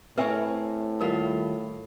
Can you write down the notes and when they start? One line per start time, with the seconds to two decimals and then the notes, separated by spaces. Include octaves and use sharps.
0.18 A2 C4 A#4 B4 C#5 E5 G#5
1.01 D#2 G3 F4 A#4